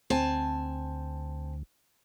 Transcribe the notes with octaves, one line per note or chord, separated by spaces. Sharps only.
D2 C4 G#5 A5